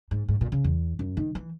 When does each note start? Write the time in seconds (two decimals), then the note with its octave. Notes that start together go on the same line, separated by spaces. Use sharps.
0.11 G#2
0.28 G#2
0.41 A#2
0.52 C#3
0.64 E2
0.99 F#2
1.17 D#3
1.35 E3